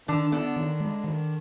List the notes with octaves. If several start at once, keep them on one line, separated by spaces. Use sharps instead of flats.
D3 D#3 D4
D3 B3 D4
D#3
G#3
D#3